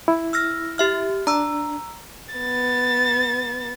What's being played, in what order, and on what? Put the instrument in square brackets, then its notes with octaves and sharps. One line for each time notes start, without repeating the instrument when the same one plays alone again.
[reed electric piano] E4
[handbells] E6 F6 A#6
G4 E5 F6
[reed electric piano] D4 [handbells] A#5 E6
[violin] B3 A6